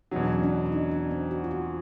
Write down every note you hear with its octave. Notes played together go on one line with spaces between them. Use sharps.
E2 B2 F#3 D#4
D4
C#4
D4
D4
D#4
D4
C4
F#4
F4
F#4